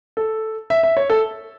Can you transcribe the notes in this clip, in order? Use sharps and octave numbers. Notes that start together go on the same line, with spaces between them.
A4
E5
E5
C#5
A4